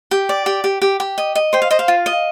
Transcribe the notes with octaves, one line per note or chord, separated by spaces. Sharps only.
G4
D5
G4
G4
G4
G4
D#5
D#5
C5 G5
F5
C5 D#5
F5
F4
D#5